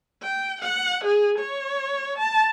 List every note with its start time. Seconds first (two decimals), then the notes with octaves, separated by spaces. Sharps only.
0.23 G5
0.62 F#5
1.04 G#4
1.39 C#5
2.19 A5